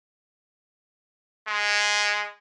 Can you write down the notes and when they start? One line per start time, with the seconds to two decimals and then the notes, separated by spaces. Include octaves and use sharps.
1.48 G#3